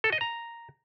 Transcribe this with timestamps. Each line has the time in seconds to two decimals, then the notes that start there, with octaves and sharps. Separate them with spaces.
0.04 A4
0.12 D#5
0.21 A#5